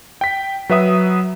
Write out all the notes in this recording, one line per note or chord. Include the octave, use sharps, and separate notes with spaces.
G5 B6
F#3 B4 E5 D#6